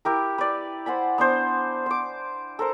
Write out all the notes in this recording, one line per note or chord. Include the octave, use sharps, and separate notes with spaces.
E4 G4 A#4
B4 D5
C5 F#5 G#5 B5
B3 D4 C5
C5 D6
A4 A#4 C5 A#5